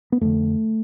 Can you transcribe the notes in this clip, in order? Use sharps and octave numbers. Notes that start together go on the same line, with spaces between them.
B3
F2 D3 A3